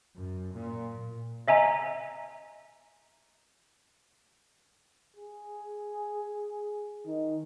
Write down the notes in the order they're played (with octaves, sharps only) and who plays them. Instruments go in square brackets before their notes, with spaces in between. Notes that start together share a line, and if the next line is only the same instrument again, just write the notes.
[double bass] F#2
A#2
[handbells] D#5 E5 G#5 A#5
[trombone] G#4
[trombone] D#3 [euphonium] D#4